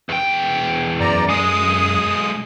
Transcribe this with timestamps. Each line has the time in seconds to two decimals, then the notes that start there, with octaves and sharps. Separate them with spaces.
0.09 E2 G5
1.00 F#2 D5 A#5
1.29 B1 G#3 D#6